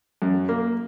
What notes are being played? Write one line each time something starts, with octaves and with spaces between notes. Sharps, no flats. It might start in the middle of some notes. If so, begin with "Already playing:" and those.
F#2
A#3